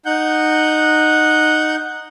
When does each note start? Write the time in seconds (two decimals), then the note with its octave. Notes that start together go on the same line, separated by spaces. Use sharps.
0.06 D#4 F#5 G6